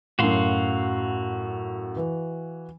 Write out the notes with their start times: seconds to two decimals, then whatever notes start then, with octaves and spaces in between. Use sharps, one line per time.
0.19 F#2 A2 F#4 F5 C6
1.96 E3